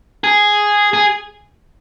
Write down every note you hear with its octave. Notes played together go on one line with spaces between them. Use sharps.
G#4
G#4